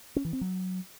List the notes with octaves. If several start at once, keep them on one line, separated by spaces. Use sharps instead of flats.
C#4
E3
C4
F#3